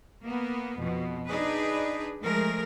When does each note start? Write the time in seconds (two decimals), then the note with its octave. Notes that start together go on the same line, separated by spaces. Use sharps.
0.22 A#3 B3
0.77 F2 B2
1.26 D4 D#4 G#4 B4
2.22 F3 G#3 A3 G#4 A#4